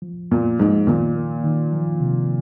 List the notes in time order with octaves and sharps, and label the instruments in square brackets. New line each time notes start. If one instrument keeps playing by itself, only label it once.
[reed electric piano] F3
[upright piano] A#2 [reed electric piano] A#3
[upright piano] G#2 [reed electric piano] F3
[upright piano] A#2 [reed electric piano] D#3
[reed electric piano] A#3
D#3
F3
C3